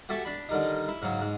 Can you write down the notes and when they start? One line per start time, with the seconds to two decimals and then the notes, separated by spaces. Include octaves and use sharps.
0.09 F#4 G4 A4 E5 G#5
0.25 D4 B5
0.49 D3 D#3 G3 D#4
0.88 E4
1.02 G#2 C#3 F#3
1.21 G#2